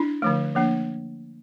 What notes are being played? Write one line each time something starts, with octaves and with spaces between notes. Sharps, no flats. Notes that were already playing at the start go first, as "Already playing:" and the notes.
Already playing: D4 E4
D3 F3 A3
F3 A#3 D4